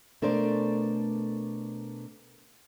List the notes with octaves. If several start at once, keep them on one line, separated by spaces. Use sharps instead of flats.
B2 A3 D4 A#4 C5 D5